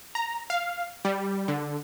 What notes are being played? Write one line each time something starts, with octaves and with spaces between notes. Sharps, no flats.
A#5
F5
G3
D3